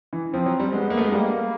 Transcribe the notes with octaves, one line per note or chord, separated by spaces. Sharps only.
E3
F3 C4
F#3
G3
G#3 B3
A#3
A3
G#3
G3 A#3